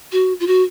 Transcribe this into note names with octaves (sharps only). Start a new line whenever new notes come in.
F#4
F4
F#4